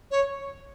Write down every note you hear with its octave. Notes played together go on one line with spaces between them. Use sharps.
C#5